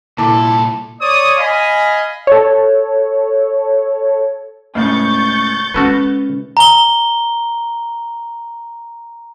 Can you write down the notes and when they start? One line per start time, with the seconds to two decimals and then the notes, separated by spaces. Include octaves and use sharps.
0.18 C2 A#2 E4 A4 A5 D6
1.01 C#5 D5 D#6
1.38 D#5 F5 G#5 B5
2.27 A4 C#5
4.75 C#2 A2 C#3 C#6 G6 A6
5.74 G#3 B3 C#4 F#4 A4 B4 F6
6.57 A#5 G7